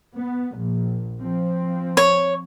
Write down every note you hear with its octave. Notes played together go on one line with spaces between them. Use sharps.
B3
A#1
F3 C4
C#5